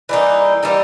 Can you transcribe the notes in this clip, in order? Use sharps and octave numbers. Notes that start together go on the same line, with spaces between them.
E3 G3 A#3 D#4
E3 G3 A#3 D#4